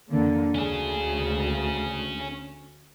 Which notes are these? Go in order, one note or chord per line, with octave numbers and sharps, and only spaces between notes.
F2 D3 A#3
D2 C#4 G#4